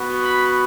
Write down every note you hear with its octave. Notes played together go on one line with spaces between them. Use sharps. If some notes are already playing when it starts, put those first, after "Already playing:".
Already playing: B3 F#4
B5